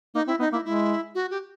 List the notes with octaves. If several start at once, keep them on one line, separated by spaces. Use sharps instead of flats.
A#3 D#4
C4 E4
B3 D#4
A#3 E4
G#3 E4
F#4
G4